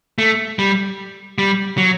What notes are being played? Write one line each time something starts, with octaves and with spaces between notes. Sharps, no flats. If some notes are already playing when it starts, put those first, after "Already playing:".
A3
G3
G3
F#3